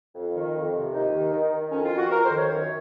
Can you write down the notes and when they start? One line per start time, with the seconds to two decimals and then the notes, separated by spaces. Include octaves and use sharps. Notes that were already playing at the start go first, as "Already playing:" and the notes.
0.15 F2
0.34 D#3
0.54 F2
0.74 C3
0.93 D#2 D#4
1.12 D#3
1.32 D#3
1.52 D#3
1.72 F2 C#4
1.85 F4
1.91 F2
1.98 F#4
2.11 F2 A#4
2.25 C5
2.31 D#3
2.38 C#5
2.51 F#2